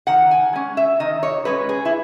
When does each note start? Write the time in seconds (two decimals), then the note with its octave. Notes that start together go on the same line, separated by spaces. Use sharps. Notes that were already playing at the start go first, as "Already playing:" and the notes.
0.07 D#3 F#5
0.31 G#5
0.53 G#3 C#4
0.77 E5
1.00 D#3 D#5
1.23 C#5
1.45 G#3 C#4 B4
1.69 G#4
1.85 E4